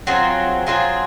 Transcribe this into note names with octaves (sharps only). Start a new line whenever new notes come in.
F#3 C4 F4 G#4
F#3 C4 F4 G#4